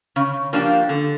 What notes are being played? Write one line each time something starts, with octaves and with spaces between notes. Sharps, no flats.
C#3
F3 A#3 D4 G4
D3